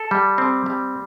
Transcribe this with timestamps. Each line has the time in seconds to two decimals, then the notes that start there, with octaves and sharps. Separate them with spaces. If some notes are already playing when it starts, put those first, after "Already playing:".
Already playing: A4
0.11 G3
0.38 C4
0.66 G3